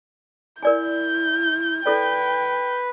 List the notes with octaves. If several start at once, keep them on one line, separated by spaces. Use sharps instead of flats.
E4 A#4 D5 G#5 G6
E4 A4 B4 D5 G5